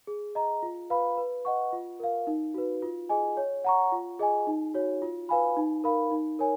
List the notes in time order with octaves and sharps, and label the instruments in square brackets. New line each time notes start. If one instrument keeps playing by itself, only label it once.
[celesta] G#4
D#5 A#5
F4
B4 F5 B5
B4
D#5 F#5 C#6
F4
A#4 F5
D#4
F#4 B4
F4
G#4 D#5 G#5
C#5
F#5 A#5 C#6
F4
G#4 D#5 G#5
D#4
F#4 C#5
F4
B4 F5 G#5 B5
D#4
A#4 F5 B5
D#4
A#4 C#5 G#5